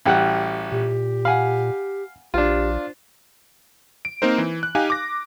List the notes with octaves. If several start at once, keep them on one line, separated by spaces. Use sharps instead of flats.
A1 G3 F#4 F#5 G5 A5
A#2 G4
F5 F#5 G#5 B5
A#1 D4 F4 G4 C5
D7
A#3 C4 D#4 A#4 C5
E3
F#6
D#4 G4 F5 G#5
D6 A#6